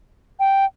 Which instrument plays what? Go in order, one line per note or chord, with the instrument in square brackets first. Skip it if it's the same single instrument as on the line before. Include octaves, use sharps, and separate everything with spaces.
[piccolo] G5